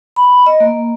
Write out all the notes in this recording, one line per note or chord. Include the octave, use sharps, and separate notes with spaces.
B5
D#5
A#3